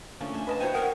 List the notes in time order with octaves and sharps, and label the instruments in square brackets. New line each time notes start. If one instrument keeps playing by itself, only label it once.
[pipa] F3 [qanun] A3 C#4 D4 [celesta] F5
[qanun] C5 E5 G#5
[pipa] B4 D#5 A5
[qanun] F#4 C#5 G#5 [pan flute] C5 [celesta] G5
[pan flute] A#4 [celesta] F#5 G5 D#6